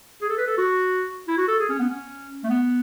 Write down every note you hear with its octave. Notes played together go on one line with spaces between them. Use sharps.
G#4
A4
B4
A4
F#4
E4
F#4
A4
G#4
C#4
B3
C#4
A3
B3